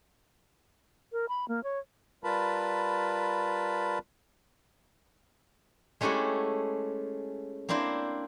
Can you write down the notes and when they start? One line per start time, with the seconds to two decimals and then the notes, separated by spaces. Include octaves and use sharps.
1.12 A#4
1.29 B5
1.48 A#3
1.64 C#5
2.24 G3 F4 A#4 B4 A5 B5
6.01 G#3 A3 C#4 E4 G4 F#5
7.69 A#3 C4 D4 E4 C5